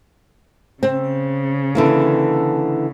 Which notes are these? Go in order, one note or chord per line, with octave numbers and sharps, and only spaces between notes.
C#3 C4
D3 E3 A#3